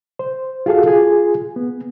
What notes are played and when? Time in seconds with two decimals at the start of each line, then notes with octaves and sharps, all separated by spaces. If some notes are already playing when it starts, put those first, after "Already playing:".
0.19 C5
0.66 F4 F#4 G#4 A4 F5
0.86 F4 G#4 G#5
1.56 B3